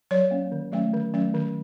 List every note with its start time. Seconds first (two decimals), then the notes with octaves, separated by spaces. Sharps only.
0.11 F#3 C#5
0.31 A#3 C#4
0.52 D#3
0.72 F#3 A3 C#4
0.93 D#3
1.14 F#3 A3 C#4
1.34 D#3